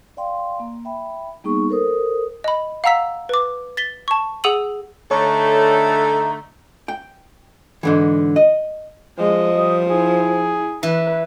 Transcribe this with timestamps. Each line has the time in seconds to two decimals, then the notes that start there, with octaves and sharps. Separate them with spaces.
0.17 D5 F5 G5 C6
0.60 A#3
0.85 E5 G5 B5
1.44 G3 A#3 B3 D#4 G#4 C#6
1.70 A4 A#4 C5 D#6
2.44 D#5 B5
2.84 F5 F#5 A#5 E6 B6
3.29 B4 D6
3.77 A6 B6 G7
4.08 A5 C#6
4.44 G#4 F#5 D#6 E6 D#7 F#7
5.11 D3 A3 D#4 A4 C#5
6.88 G5
7.83 G#2 D3 E3
8.36 D#5
9.18 F3 G#3 D#5
9.57 G3 D#5
9.90 E4 G#4
10.83 E3 B4